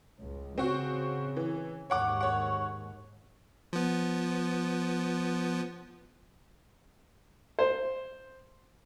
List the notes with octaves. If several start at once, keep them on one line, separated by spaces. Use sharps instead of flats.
C#2
C#3 C4 F#4
E3
D#2 G#2 C#5 F#5 D6
C#5 F#5
F3 B3
C5